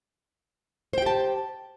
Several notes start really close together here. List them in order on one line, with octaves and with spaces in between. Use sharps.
C5 G5 G4 A5